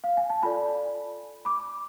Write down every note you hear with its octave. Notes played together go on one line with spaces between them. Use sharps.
F5
G#5
A5
F4 A4 D5 G#5 B5
B5 D6